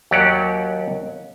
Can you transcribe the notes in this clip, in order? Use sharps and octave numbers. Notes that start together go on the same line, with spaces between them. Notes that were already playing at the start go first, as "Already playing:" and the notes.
D#2 F#3 G4 D5 F#5